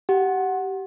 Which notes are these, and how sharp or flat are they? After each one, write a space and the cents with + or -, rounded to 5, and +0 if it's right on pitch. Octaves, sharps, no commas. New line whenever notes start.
G4 -25 F#5 +0